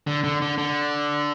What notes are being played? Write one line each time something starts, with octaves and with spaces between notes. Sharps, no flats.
D3
D3
D3
D3